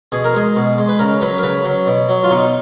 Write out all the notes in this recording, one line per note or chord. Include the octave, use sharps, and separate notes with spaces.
B2 G#4
A#4
G#3 G#4
B2
G#3
B4
C#3 A#4
F#3 B4
A#4
C#3 B4
F#3
B2
F#3
F4
B2 D#4